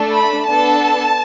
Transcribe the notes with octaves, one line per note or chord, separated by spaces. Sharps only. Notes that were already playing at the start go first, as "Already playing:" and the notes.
Already playing: A3 D4 A4
B5
B3 D4 A4 A5